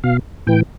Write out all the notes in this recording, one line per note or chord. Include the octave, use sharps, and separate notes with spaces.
B2 F5
A2 E3 G5